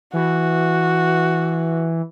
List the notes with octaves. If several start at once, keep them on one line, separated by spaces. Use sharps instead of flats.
E3 F#4